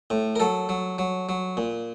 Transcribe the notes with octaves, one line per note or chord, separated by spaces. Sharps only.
A2
A#4
F#3 A4
F#3
F#3
F#3
A#2